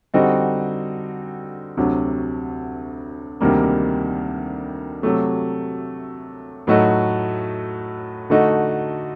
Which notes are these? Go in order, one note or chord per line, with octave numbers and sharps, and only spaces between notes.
D3 G3 C4 D#4 F#4
D2 C3 F#3
D2 C3 D#3 G3 A#3
C3 F#3 A3
A2 F#3 A3 D#4 F#4
D3 A3 D#4 F#4